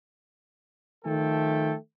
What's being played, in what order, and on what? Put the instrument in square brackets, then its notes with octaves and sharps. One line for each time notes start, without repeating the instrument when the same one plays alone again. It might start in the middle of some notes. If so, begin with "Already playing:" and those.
[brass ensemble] D#3 F3 A3 A4 G5